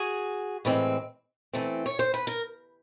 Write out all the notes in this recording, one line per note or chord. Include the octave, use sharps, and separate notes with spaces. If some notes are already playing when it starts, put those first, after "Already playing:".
Already playing: F#4 G#4
A2 E3 G#3 C4
E3 A3 C4
C#5
C5
B4
A#4